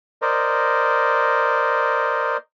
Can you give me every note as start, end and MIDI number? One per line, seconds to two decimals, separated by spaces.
0.22 2.37 70
0.22 2.37 72
0.22 2.37 74
0.22 2.37 75